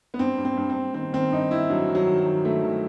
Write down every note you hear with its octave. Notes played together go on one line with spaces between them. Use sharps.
B3
G2 C4
G2
C4
G2
C4
G2
D#3 C4
D#3 C4
G2 D#4
D#3 E4
G2 F#3
D#3
F#3
D#3
F#3
D#3
G2 A3
D#3